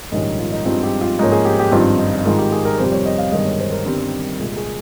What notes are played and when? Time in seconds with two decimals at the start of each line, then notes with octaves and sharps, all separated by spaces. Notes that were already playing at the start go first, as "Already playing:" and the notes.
0.12 A#1 G#2 D#3 G3 C#4 D#5
0.39 F4
0.52 D#4
0.65 G2 F3 G#3 C4 D#4 F4
0.83 G4
1.01 F4
1.19 G#2 F3 A#3 C#4 D#4
1.32 G#4
1.45 G4
1.59 G4
1.72 G#1 G2 F3 C4 D#4 F4
1.99 D#4
2.25 G#2 D#3 G#3 D#4 F4
2.38 G4
2.52 G#4
2.65 A#4
2.79 F2 C3 G3 C5
2.92 C#5
3.06 D#5
3.18 F5
3.31 G1 G2 D#3 G#3 D#5
3.45 C#5
3.59 C5
3.72 A#4
3.85 G1 G2 D#3 G3 C4
4.39 C2 A#2 G#3
4.57 G#4